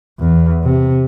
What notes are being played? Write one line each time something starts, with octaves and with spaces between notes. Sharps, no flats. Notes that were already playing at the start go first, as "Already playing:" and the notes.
E2
C3